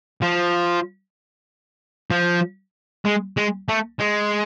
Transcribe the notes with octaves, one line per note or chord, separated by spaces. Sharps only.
F3
F3
G#3
G#3
A3
G#3